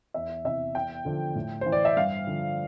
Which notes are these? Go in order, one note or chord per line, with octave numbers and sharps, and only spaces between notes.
E2 E5
C3 E3 E5
E2 G5
D3 F3
A2
E3 C5
D5
E5
G2 F5
D3 F3